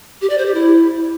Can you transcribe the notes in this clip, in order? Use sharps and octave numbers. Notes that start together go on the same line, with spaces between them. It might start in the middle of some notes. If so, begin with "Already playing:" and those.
G4
D5
C5
G4
E4